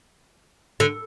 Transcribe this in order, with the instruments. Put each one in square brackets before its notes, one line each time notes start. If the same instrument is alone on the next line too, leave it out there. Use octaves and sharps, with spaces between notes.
[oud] D3